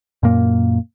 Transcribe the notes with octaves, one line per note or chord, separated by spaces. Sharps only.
F#2 A#2 A#3